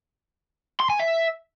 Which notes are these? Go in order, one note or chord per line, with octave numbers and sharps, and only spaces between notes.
C6
G#5
E5